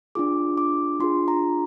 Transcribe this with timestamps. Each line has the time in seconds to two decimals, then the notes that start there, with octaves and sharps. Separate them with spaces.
0.15 D4 F4 G#4 D6
0.58 D6
1.00 D4 F4 G#4 C6
1.28 A#5